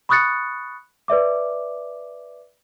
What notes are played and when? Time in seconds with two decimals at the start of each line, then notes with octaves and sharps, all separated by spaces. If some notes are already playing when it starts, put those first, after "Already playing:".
0.09 B5 C#6 D#6 F#6 A6 C#7
1.08 B4 D5 E5 D6